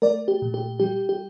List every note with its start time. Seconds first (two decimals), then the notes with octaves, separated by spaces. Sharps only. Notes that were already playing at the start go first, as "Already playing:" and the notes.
0.02 A3 A#4 D5
0.28 G4
0.42 A#2
0.54 G4
0.80 G3 G4
1.09 G4